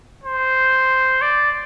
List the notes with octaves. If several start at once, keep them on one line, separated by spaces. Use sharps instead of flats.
C5
D5